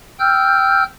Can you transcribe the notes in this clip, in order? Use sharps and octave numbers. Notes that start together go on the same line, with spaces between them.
G5 E6 F6 G6